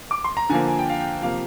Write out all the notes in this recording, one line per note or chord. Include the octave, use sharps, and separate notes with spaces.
D6
C6
A#5
D3 F3 A#3 G#5
G#5
G5
F5
G5
C3 F3 A#3 F5